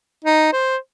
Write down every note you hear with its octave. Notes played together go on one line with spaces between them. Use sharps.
D#4
C5